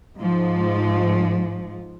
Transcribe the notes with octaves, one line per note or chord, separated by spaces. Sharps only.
G#2 F3